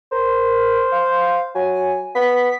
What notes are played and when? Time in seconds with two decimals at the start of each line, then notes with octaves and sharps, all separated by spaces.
0.12 A#4 C5
0.92 F5
1.55 F#3 G#5
2.15 B3 B6